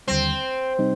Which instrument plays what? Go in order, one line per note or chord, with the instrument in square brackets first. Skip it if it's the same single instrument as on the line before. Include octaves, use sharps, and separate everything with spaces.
[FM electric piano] D#2 D3 G3 [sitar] C4
[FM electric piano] C3 G3 C4 D#4